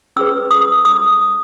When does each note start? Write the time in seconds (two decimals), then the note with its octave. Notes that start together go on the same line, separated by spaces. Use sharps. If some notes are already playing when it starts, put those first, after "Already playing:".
0.16 C#4 G#4 B4 E6
0.51 D#6
0.85 D#6